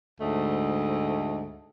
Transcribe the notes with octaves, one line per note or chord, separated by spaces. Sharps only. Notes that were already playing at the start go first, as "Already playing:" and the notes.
D2 G#2 A3 D#5